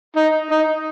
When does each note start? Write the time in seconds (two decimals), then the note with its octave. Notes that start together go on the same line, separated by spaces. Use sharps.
0.16 D#4
0.51 D#4